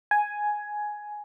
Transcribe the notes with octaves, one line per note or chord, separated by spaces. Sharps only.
G#5